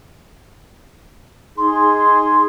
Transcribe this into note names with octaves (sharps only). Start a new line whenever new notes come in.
D#4 G#4 C6